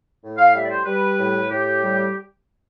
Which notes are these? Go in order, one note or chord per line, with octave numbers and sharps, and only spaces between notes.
A2
F5
G3 E5
D5
C5
G3 B4
A2
A2 G4
G3